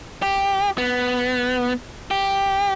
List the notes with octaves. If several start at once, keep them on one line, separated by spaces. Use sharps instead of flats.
G4
B3
G4